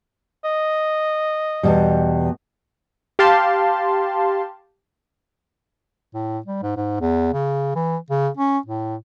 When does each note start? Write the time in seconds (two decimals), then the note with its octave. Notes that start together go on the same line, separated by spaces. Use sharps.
0.45 D#5
1.63 E2 B2 G3
3.19 G4 F5 A5 C6
6.14 A2
6.46 G3
6.63 G#2
6.76 G#2
7.00 E2
7.34 C#3
7.76 E3
8.10 C#3
8.37 C#4
8.66 A2